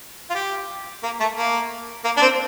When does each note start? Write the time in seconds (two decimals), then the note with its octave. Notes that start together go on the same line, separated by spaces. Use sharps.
0.30 F4
0.35 G4
1.03 A#3
1.20 A3
1.36 A#3
2.04 A#3
2.17 D4
2.22 C4